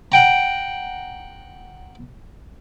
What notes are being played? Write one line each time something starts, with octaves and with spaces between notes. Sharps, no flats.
F#5 G5 A#5